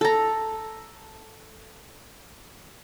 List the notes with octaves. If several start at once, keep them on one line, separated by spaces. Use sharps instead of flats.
A4 A#5